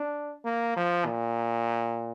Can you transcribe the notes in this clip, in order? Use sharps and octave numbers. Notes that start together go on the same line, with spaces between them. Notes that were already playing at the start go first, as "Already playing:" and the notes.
Already playing: D4
A#3
F3
A#2